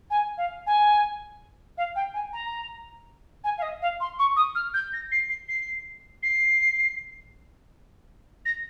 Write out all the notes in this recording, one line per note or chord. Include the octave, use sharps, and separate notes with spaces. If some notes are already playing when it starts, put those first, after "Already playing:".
G#5
F5
G#5
F5
G5
G#5
A#5
G#5
F5
D#5
F5
C6
C#6
D#6
F6
G6
A#6
C7
C7
C7
C7
A#6